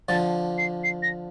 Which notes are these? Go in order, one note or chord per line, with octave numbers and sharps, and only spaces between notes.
D3 F3 A6
C7
C7
A#6